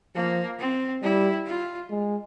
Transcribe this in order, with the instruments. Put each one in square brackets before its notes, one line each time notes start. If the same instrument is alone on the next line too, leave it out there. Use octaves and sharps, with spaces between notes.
[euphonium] F3 [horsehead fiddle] A#3
[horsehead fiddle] C4
[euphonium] G3 [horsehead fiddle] E4
[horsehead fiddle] F4
[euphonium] G#3